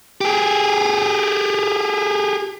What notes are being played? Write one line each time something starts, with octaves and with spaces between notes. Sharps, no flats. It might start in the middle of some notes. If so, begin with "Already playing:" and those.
G4 G#4